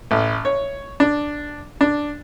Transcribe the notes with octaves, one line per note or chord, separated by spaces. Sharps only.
A1
C#5
D4
D4